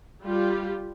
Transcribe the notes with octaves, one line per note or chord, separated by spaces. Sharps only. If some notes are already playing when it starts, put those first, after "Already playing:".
G3 F4 G4